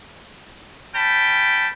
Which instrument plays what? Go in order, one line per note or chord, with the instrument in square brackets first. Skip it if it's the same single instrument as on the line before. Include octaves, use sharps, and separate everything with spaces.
[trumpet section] C#4 G5 A5 B5